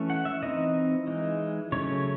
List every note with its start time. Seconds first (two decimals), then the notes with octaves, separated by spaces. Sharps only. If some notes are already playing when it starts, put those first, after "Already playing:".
Already playing: E3 A3 C#4
0.10 F#5
0.25 E5
0.43 E3 C4 D#4 D#5
1.07 E3 G#3 D#4
1.72 C#3 F#3 A3 C#4 C#5